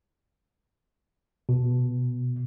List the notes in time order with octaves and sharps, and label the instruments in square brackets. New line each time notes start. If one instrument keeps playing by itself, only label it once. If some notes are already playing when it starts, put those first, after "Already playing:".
[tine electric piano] B2